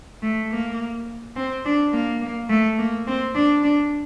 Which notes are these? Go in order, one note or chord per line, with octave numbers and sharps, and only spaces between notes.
A3
A#3
C4
D4
A#3
A#3
A3
A#3
C4
D4
D4